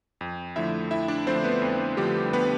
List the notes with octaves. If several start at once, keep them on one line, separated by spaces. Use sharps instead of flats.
F2
D3 F3 A3 E4 E5
F2 E4 E5
D4 D5
D3 F3 A3 C4 C5
B3 B4
F2
D3 F3 G3 A3 G4
B3 B4